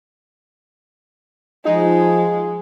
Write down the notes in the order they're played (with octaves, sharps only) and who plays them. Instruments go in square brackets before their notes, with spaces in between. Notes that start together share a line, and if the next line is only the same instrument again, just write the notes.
[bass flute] F3 [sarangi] G#3 [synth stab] D#4